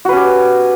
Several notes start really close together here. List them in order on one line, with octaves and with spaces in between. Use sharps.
F#4 B4 C#4 G4